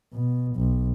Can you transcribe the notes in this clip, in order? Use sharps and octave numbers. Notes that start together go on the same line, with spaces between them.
B2
B1